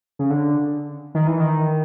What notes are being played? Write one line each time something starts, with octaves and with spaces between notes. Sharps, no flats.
C#3
D3
D#3
E3
D#3